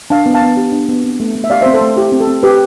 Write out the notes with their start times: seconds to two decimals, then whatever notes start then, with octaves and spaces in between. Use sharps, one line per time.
0.10 D4 F5 A5
0.26 B3
0.34 F5 A5
0.41 B3
0.57 G4
0.72 D4
0.88 B3
1.04 C4
1.20 A3
1.35 A3
1.44 E5
1.50 G4 D5 F5
1.61 C5 E5
1.66 C4
1.74 A4 C5
1.81 A3
1.96 E4 G4
2.12 C4
2.20 A4
2.27 C4
2.43 G4 B4